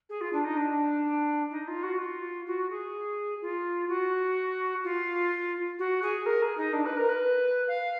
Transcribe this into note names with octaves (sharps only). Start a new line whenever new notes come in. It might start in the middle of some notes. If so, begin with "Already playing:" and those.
G#4
F4
D4
D#4
D4
D#4
F4
F#4
F4
F#4
G#4
F4
F#4
F4
F#4
G#4
A#4
G#4
D#4
D4
B4
A#4
B4
F5